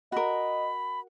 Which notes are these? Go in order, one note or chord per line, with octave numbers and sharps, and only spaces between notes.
F#4 A#4 D#5 B5